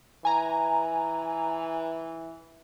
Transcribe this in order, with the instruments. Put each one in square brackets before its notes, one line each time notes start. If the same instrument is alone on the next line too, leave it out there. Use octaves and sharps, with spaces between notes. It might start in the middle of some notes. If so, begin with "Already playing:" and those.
[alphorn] E3 [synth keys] G#5 A#5